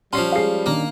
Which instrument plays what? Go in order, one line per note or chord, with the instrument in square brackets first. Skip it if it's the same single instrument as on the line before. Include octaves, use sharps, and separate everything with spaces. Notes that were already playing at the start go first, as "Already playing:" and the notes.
[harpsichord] F3 C#4 [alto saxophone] G3 [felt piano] C6 C7
[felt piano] G#3 C7 [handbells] G#4 F5
[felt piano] D#3 C#4 D4 [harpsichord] A#3